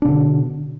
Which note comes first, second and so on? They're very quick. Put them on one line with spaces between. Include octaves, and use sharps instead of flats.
D4 B2 D3